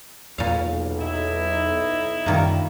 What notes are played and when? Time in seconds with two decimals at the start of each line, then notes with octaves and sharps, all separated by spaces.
0.38 B1 E2 A#2 F5
0.99 D#4 E4
2.26 F#2 A#2 D#3 G3 A#3